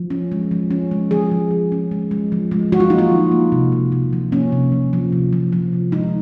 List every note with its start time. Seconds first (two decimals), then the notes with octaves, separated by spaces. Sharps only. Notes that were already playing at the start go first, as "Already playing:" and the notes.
Already playing: F3
0.10 C#4
0.32 G#3
0.51 F3
0.71 C#4
0.91 G#3
1.11 F3 G#4
1.31 F3
1.51 G#3
1.72 C#4
1.91 G#3
2.11 G#3
2.32 F3
2.51 G#3
2.72 F3 F#4
2.80 F4
2.90 A#3 D#4
2.98 F4
3.12 F3
3.31 A#3
3.52 C3
3.72 C3
3.92 C3
4.13 F3
4.32 A#3 C#4
4.52 C3
4.72 F3
4.93 F3
5.12 C3
5.33 F3
5.53 F3
5.73 C3
5.92 G#3 D#4